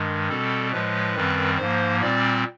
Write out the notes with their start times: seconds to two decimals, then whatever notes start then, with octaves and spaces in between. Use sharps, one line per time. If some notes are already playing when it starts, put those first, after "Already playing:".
Already playing: G2 D#3 G#3
0.29 B2 G3 C4 A4
0.72 A2 F3 G#3 B4
1.15 F#2 D#3 G3 C4
1.58 G#2 F3 A#3 C5
2.01 A#2 G3 C4 D5